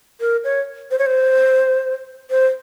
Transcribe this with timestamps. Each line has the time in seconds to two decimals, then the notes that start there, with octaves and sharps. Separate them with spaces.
0.20 A#4
0.44 C#5
0.91 C5
0.99 C#5
1.06 C5
2.30 C5